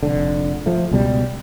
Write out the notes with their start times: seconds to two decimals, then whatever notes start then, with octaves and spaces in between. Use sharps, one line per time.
0.03 F1 D3
0.66 F3 A3
0.91 C#2 B2 G3